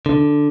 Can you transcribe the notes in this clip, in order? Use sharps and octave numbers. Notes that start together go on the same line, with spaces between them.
D3